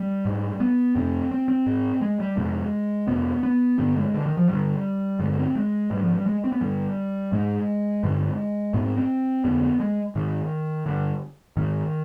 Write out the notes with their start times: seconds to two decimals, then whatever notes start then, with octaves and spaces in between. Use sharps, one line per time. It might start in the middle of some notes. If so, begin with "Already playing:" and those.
Already playing: G3
0.25 G#2
0.60 B3
0.95 F2 C3 C4
1.31 C4
1.48 C4
1.66 G#2
2.01 G#3
2.20 G3
2.37 F2 C3 G#3
3.08 F2 C3 B3
3.43 B3
3.78 G2 D3 B3
3.96 G#3
4.14 D3
4.26 D#3
4.37 F3
4.49 G2 D3 G3
5.20 G2 D3 G#3
5.38 C4
5.55 G#3
5.91 G#2 G3
6.03 F3
6.15 G3
6.26 G#3
6.44 C4
6.52 B3
6.61 G2 D3 G3
7.32 G#2 G#3
8.03 G2 D3
8.74 G#2 B3
8.85 C4
8.97 C4
9.44 F2 D3 B3
9.63 B3
9.80 G#3
10.15 G#2 D#3
10.86 G2 D3
11.57 G#2 D#3